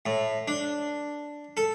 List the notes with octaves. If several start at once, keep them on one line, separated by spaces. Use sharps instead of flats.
A2
D4
A4